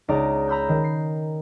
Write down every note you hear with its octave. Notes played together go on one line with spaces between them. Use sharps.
C#2 D#4 D5 A#5
A#5 B5 E6 G6
D#3
C7